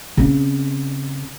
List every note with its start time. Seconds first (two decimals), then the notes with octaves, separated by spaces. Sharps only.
0.17 C#3 C4